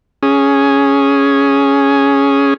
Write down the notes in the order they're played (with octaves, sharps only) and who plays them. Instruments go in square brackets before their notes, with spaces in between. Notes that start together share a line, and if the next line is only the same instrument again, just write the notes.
[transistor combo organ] C#4 G#4